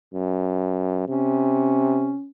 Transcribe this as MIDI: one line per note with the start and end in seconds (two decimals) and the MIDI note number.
0.14 1.07 42
1.08 2.16 48
1.08 2.28 61